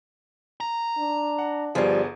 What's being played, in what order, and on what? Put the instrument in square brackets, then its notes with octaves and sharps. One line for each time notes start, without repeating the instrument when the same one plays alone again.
[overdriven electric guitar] A#5
[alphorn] D4
[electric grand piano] F#5
[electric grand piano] G1 B3 G#4 [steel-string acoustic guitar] F3 G3